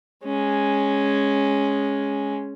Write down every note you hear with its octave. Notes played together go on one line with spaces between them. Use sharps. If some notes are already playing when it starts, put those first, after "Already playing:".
G#3 C#4